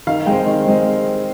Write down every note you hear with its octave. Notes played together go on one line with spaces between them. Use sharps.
D#3 F5
G#3 C4 G5
D#3
G#3 C4